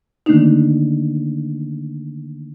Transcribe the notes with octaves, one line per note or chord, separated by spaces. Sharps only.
D3 D#3 A3 A#3 D4 D#4